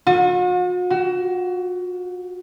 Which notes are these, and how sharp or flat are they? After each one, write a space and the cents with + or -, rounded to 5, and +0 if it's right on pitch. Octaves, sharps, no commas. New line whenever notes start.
F#4 -45
F#4 +30